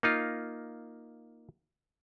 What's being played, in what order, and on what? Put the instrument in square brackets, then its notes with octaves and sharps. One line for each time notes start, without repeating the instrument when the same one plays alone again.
[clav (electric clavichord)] A#3 D#4 F4